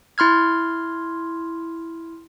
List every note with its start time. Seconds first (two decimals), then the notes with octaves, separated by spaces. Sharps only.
0.18 E4 C6 F6 G#6